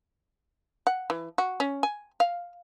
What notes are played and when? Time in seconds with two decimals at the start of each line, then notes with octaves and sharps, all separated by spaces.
0.87 F#5
1.10 E3
1.38 F#4
1.60 C#4
1.83 G#5
2.20 F5